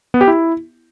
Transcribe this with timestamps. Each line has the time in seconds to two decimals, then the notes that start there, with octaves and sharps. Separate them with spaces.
0.14 B3
0.21 G4
0.28 E4